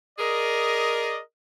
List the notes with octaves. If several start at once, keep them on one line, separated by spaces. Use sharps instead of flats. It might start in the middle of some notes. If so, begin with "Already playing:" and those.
G#4 A#4 D5 D#5